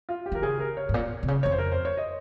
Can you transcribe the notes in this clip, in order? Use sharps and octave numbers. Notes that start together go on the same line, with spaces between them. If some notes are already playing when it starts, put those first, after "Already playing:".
F4
G4
D#3 A#4
C#3 G#4
A#4
C#5
G#2
A#2
C3
C#3
F2 C#5
C5
A#4
C5
C#5
D#5